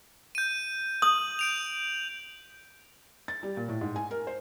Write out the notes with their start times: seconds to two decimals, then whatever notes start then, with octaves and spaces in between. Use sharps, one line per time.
0.35 G6 D#7
1.02 D#6 F#7
1.39 G6 D7 F7
3.28 A6
3.43 G3
3.57 A#2
3.69 A2
3.81 G#2
3.96 G#5
4.11 A#4
4.27 C5